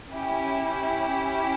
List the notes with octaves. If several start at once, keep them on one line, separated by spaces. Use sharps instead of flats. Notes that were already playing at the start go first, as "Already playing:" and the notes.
C#4 E4 G4